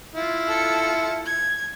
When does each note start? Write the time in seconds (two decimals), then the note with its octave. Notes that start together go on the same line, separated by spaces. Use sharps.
0.16 E4 F4
0.47 A4 C#7
1.26 G#6